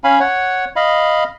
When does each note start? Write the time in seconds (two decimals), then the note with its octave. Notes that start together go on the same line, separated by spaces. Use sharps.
0.04 C#4 F5 G#5 B5
0.20 C#5 F#5
0.76 D#5 F5 B5